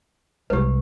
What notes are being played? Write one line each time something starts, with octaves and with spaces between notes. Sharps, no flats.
C2 G#3 G4 B4